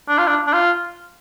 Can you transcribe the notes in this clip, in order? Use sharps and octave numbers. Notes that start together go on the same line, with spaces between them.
D4
F4
D4
D4
F4